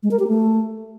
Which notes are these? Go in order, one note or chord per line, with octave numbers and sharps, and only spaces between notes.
G#3
A#4
G4
A3